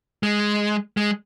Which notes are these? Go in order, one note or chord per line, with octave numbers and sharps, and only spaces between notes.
G#3
G#3